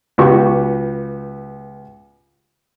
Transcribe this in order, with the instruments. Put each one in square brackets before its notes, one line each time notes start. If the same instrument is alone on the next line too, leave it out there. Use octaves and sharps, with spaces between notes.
[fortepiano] C#2 B3 F#4 G4 C#6 D6